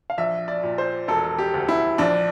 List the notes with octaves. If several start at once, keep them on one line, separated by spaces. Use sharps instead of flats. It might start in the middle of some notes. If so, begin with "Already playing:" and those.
F5
A#1 E5
D5
A#2
C5
E1 A4
G4
D2
E4
A#1 D4